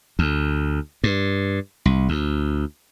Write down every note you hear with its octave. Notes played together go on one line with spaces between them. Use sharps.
D2
G2
C2
D2